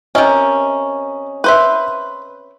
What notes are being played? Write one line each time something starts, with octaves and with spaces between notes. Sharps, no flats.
C3 C#4 A#4 D#5
B4 C5 E5